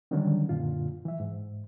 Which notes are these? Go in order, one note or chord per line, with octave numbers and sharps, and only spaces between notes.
D3 D#3 F#3 G3 C#4 D4
F#2 A#2 D3 F4
E3 E5
G#2